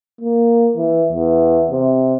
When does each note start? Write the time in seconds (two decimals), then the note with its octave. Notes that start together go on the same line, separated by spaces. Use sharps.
0.21 A#3
0.77 E3
1.12 E2
1.71 C3